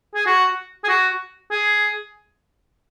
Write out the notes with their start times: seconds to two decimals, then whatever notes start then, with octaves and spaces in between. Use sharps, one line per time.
0.14 G#4
0.26 F#4
0.84 G#4
0.88 F#4
1.51 G#4